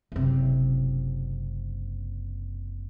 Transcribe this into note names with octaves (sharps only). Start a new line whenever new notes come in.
F#1 C3